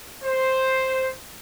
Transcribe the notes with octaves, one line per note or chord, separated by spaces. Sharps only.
C5